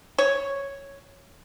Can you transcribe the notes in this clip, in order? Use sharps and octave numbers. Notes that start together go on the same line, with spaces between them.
C#5